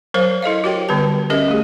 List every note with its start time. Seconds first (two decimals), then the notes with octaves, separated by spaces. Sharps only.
0.14 F#3 A#4 C5 C#5 F5
0.42 E4 A4 D#5 F5
0.64 F#4 G4 A#4 C#5 G5
0.89 D3 G3 B3 B4 A5
1.30 C#4 G4 A#4 D#5 E5
1.48 A3 G#4